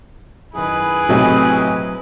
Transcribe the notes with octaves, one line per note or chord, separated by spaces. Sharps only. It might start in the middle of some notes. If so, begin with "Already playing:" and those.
F#2 D#3 E4 G#4 B4
B1 A2 C3 F#3 C4